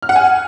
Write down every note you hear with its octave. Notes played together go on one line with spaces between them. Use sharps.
F6
F#5
G#5